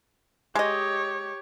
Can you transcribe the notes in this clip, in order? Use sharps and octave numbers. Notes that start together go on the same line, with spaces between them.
G#3 G4 C#5 D#5